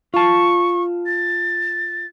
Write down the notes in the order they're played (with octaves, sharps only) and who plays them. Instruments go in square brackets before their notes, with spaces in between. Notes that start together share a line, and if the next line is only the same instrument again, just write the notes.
[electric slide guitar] F4 A5 [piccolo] C#6
[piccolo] A6